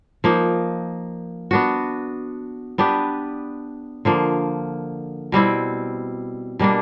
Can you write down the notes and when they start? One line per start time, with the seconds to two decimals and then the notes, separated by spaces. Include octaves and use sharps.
0.24 F3 A#3 D#4
1.51 B3 D4 F#4
2.78 B3 D4 G4 B4
4.05 D3 F3 A#3
5.32 B2 G3 C4 E4
6.59 B2 G3 A#3 D4